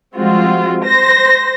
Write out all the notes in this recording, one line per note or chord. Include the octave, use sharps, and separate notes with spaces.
F3 G3 G#3 C4 F4 F#4
C5 A#6